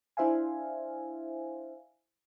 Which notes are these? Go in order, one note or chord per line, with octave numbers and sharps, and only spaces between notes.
D4 E4 C5 E5 F5 G#5